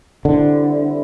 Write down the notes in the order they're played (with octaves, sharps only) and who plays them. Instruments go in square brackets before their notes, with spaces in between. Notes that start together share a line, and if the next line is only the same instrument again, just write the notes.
[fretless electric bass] D3 [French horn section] E3 G3 C4 E4